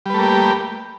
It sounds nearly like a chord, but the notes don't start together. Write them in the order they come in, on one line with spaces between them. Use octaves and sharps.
G3 B4 A3 A#3 G4